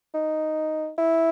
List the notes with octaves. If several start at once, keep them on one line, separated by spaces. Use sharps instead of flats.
D#4
E4